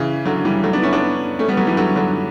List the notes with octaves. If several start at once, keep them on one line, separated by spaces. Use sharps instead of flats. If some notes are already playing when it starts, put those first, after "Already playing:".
Already playing: C#3 E3
D3 F#3
E3 G3
F#3 A3
B3 D4
C#4 E4
B3 D4
A3 C#4
G3 B3
F#3 A3
E3 G3
D3 F#3
D3 F#3